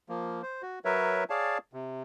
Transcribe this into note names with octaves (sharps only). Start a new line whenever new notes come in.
F3 A#3
C5
F#4
F#3 A#4 B4 C#5 E5
G#4 C#5 D5 F5 A5
C3